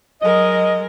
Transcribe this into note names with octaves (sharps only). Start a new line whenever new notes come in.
F#3 G#3 A#4 D#5